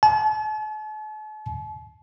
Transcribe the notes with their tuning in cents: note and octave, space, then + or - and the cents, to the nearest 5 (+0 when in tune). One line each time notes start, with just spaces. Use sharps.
A5 -45